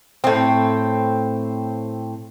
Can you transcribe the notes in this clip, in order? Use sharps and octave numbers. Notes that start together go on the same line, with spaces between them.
A2 C4